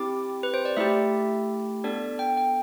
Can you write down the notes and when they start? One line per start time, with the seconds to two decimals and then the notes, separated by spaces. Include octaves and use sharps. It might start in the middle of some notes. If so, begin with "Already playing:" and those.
Already playing: C4 E4 G4 D6
0.43 B4
0.54 C5
0.65 D5
0.77 A3 E4 G4 E5
1.84 B3 D4 A4 D5
2.19 G5
2.37 G5